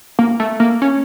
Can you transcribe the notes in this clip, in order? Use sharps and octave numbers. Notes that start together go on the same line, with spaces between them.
A#3
A3
A#3
C#4